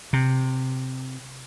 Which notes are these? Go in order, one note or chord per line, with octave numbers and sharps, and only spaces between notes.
C3